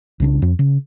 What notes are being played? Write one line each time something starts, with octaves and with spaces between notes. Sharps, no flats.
C2 C#3 D4
F2
C#3